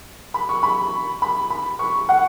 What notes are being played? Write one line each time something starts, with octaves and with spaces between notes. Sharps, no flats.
B5
C#6
B5
B5
B5
C#6
F#5